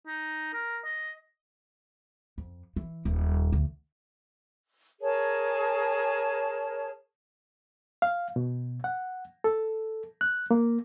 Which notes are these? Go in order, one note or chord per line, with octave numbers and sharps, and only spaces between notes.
D#4
A#4
D#5
F2
E3
D#1
D2
G#4 A#4 C#5 A5
F5
B2
F#5
A4
F#6
A#3